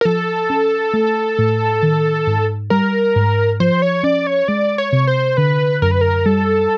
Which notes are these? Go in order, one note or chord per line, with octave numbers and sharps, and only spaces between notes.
A#4
F3 A4
C#4
A3
A2
D#3
G#2
G3 A#4
G#2
F3 C5
C#5
C#4 D5
C#5
G#3 D5
C#5
C3
C5
D3 B4
F#2 A#4
B4
A#4
G3 A4